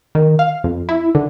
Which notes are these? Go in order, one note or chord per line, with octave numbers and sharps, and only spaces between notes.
D#3
F5
F2
E4
D3